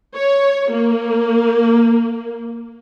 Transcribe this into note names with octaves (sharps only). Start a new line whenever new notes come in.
C#5
A#3